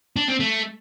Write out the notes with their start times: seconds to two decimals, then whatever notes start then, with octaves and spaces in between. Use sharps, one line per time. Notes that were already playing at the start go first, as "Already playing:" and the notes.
0.16 D4
0.28 C4
0.40 A3